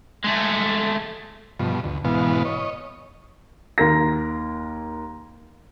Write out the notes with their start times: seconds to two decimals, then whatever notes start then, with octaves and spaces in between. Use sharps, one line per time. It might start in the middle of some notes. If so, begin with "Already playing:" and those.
0.24 G#3 A3
1.59 G2 B2 F3
1.84 D2
2.05 G#2 B2 E3 B3 F5
2.45 C#5 D#5
3.78 D#2 A#4 A#6